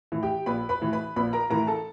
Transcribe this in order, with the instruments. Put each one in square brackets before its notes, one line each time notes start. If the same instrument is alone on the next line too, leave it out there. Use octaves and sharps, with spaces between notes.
[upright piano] A2 E3
G4 G5
A#1 B4 B5
B4 B5
A2 E3
B4 B5
A#1 B4 B5
A#4 A#5
A2 E3 A#4 A#5
A4 A5